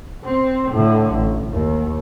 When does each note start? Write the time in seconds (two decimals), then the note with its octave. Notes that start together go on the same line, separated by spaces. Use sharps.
0.25 C4
0.72 A2 D3
1.14 A1
1.51 D#2